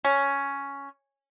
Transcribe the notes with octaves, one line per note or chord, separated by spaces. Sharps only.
C#4